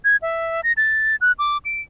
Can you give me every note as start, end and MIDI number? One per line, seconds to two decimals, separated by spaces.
0.05 0.16 92
0.22 0.61 76
0.64 0.73 94
0.77 1.16 93
1.21 1.32 90
1.39 1.58 86
1.65 1.81 98